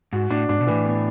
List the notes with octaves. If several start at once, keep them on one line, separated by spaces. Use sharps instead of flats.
G#2 F#4
A2 D4
G#2 D4
B2
A2 E3
B3